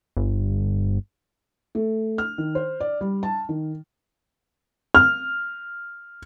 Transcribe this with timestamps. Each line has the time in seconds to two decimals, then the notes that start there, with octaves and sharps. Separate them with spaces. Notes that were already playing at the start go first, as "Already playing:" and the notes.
0.17 G1
1.75 A3
2.18 F6
2.38 D#3
2.55 C5
2.80 D5
3.01 G3
3.23 A5
3.49 D#3
4.95 F6